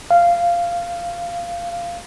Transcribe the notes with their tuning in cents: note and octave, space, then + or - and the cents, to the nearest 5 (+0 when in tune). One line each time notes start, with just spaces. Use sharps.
F5 -10